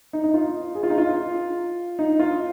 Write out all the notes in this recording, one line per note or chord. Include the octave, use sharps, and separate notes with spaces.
D#4
D#4
F4
G#4
F4
D#4
F4
D#4
F4